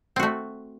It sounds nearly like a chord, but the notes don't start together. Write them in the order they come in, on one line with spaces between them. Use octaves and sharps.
C4 F#4 A3